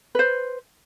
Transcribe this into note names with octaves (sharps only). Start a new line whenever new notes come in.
B4 C5